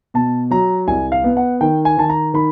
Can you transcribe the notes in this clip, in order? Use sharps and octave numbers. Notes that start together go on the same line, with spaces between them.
B2 A5
F#3 A#5
C2 G#5
F5
B3
F#5
D#3 G5
G#5
D#3 A5
A#5
D#3 B5